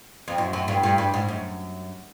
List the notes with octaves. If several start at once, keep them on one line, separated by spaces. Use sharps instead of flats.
F2
F#2
F#2
G2
G2
G2
G#2
F#2